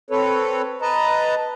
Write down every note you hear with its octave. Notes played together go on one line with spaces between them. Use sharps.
C4 A4 B4 C#5
B4 D#5 A5 A#5